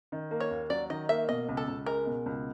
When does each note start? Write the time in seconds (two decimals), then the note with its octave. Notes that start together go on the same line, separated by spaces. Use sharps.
0.12 D#3
0.31 A#3
0.40 C#5
0.51 D#2
0.70 F#3 D5
0.90 D#3 D#5
1.09 A#3 E5
1.28 B2 D#5
1.49 C#2
1.57 A4
1.68 C#2
1.86 G#3 A#4
2.06 B2
2.26 C#2